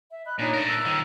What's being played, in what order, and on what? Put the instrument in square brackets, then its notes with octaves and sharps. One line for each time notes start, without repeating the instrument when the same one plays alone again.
[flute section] E5
D#5 B5 F#6
[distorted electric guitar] A#2 [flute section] D4 D#4 C#5
[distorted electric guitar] A3 A#4
[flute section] E6 F#6
[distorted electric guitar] D#3 F3